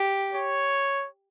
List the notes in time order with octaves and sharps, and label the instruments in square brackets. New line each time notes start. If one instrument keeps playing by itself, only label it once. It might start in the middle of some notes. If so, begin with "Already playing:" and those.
Already playing: [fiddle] G4
[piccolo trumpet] C#5